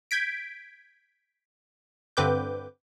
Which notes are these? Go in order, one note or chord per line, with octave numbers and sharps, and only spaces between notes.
G6 G#6 B6 D7
G2 D3 C4 B4 D6 G6